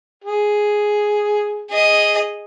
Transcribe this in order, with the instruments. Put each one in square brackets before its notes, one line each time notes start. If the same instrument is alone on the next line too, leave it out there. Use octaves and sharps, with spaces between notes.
[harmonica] G#4
[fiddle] G#4 D#5